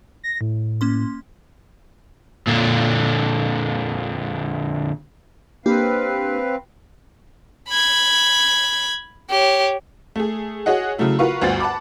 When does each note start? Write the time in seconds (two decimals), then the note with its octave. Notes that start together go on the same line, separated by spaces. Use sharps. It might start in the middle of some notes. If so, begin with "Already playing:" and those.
0.24 A#6
0.41 A2
0.81 A#3 C#4 C6
2.47 A#2 D3
5.66 A#3 C4 D4 G4 B4 F5
7.69 B5 G#6
9.30 G4 C#5
10.16 A3 G#4
10.66 F#4 G#4 C#5 D#5 F#5
10.98 C#3 F#3 A3 E4
11.19 F4 F#4 A#4 B4 F5 C#6
11.41 G1 D2 F#4 C5 A6
11.60 F#5 A5 B5 D6